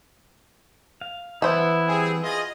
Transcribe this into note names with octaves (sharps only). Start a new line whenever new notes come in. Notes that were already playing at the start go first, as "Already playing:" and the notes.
F5
E3 B3 E4 C5 E5
G3 C4 G#4
F4 G#4 D#5